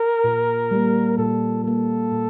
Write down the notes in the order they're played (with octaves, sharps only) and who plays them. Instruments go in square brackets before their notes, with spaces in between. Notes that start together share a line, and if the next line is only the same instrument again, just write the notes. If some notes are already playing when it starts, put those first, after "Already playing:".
Already playing: [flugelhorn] A#4
[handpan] A#2
G3 A#3
[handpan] A#2 [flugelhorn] A4
[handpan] G3 A#3 [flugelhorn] A4
[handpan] A#2